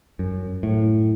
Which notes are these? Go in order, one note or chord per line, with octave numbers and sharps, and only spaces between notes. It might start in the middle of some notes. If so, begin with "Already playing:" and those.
F#2
A2